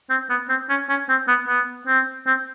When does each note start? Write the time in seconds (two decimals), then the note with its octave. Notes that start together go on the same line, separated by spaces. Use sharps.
0.10 C4
0.30 B3
0.49 C4
0.70 C#4
0.89 C#4
1.09 C4
1.28 B3
1.48 B3
1.87 C4
2.27 C4